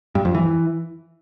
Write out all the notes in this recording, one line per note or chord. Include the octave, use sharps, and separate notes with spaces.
G2
F2
E3